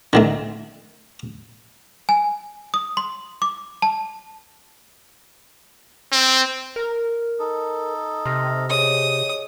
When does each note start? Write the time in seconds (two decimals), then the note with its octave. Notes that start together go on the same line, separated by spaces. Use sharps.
0.13 D3 D#3 A3
2.09 G#5
2.74 D#6
2.97 C6
3.42 D6
3.82 A5
6.13 C4
6.76 A#4
7.39 D#4 A4
8.26 C3 C6 F6 A#6
8.70 G#4 C#5 D#5 D#6